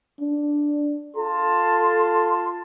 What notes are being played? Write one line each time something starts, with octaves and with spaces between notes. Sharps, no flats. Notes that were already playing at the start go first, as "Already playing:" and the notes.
D4
F4 A4 A5 C6